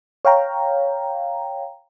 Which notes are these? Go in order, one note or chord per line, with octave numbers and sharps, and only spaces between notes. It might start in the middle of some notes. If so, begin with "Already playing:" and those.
C#5 F5 G5 A#5